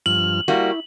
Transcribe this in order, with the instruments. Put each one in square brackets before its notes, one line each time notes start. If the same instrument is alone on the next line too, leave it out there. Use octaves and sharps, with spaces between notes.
[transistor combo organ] G2 F3 F6 [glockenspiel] F#7
[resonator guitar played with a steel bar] G3 A#3 F#4 [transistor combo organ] E4